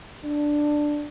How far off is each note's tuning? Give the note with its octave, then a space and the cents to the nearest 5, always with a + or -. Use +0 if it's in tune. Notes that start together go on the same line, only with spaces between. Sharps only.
D4 +5